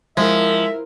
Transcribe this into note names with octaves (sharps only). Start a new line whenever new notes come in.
F3 G#3 E4 A#4 E5